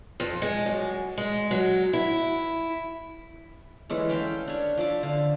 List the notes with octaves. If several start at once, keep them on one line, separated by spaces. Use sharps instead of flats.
F2
G#3
F#2
G#3
F#3
E4
E3 G#3 C#4 A4
A4 E5 F5 G5
D4 C#5
F3 D5 E5 A5
D3 F5